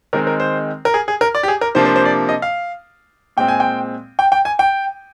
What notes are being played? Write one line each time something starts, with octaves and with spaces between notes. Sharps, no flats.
D#3 G#3 C4 A#4
A#4
C5
A#4
G#4
G#4
A#4
D5
G4
G#4
A#4
C3 F3 A#3 D4 C5
C5
C5
D5
D#5
F5
A#2 G#3 C4 G5
G#5
G5
G5
G5
G#5
G5